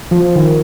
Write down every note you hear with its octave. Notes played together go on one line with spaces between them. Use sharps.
F3
D#3